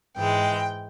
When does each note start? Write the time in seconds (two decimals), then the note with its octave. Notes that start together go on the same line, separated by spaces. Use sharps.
0.16 G#2 E3 G#3 G5